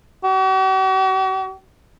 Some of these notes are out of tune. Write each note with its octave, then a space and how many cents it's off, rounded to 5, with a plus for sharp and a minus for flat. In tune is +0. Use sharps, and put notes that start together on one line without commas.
F#4 +45